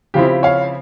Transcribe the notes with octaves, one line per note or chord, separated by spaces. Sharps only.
C#3 F3 C4 E4 G4
C#5 F5